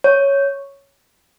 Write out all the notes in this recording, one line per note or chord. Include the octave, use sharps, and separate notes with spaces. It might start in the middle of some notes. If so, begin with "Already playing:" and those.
C#5